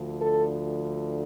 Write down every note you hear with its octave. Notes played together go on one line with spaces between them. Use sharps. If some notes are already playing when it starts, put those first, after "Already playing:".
Already playing: D2 D3 F3
A4